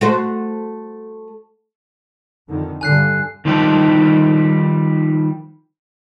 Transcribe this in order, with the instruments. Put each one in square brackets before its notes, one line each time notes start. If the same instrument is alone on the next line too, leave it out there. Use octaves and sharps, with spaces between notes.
[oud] A3 F#4 C5
[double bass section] F2 D3 D#3
[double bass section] G2 D3 [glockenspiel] G#5 F#6 C7
[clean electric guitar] D#3 F3 G3 D#4 G4 A4